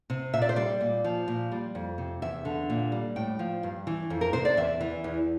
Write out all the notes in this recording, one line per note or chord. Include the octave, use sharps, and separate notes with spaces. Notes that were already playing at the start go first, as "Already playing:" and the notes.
C3
A#2 E5
D5
C5
G3 D5
A#2
F3
A#2
G3
F2
C3
E2 E5
D3
A#2
G3
A2 G5
F3
G2
E3
F2
A#4
C3 C5
D5
E2 E5
E3
E2